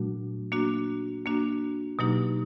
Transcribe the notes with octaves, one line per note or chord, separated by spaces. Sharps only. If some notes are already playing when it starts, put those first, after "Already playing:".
Already playing: A#2 F#3 A3 D4 F#4
A#3 D4 F#4
A#3 D4 F#4
B2 F#3 A#3 D#4 G4